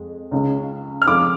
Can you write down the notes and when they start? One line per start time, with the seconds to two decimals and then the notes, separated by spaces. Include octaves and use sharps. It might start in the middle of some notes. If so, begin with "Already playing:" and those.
Already playing: F2 G#3
0.31 C#2 C#3 G#3
1.02 F6
1.07 F2 F3 G#3 D6